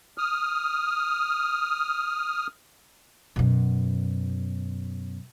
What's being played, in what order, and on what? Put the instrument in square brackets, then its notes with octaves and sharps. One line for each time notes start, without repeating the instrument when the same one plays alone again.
[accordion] D#6 F6
[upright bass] F#2 B2